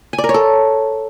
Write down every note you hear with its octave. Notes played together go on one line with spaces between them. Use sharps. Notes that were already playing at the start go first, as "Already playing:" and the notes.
G#5
D5
A#4
C#5
A4